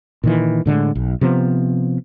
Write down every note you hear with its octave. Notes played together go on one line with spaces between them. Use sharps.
A#2 D#3 E3
A2 D3 E3 G#3
B1
C3 F3 B3